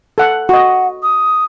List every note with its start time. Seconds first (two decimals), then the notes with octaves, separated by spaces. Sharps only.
0.18 A4 F#5
0.49 F#4 D#5 F#5
1.03 D#6